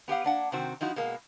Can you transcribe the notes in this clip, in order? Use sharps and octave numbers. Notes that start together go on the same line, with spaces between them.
B3 G4 F5 F#5
A#3 D4 F#5
C3 D#3 C4 F#4
F3 D#4 E4 F#4
B2 G#3 A#3